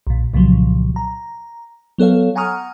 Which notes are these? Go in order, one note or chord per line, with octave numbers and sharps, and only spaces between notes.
B1 A#2
C2 A#2 C#3 F3 F#3
A#5
F#3 B3 A4 C#5 F5
F#5 G#5 A#5 C#6 D#6 F6